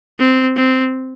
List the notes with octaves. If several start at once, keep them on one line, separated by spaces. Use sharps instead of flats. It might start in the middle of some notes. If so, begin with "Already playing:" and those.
C4
C4